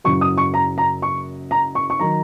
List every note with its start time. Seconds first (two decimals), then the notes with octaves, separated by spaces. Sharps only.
0.04 F#1 F#2 F#3 C#6
0.21 D#6
0.38 C#6
0.54 A#5
0.78 A#5
1.02 C#6
1.51 A#5
1.75 C#6
1.90 C#6
1.99 D#3 F#3 A#5